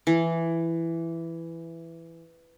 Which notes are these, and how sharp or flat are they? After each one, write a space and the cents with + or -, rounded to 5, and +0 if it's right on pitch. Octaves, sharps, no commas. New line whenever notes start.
E3 +10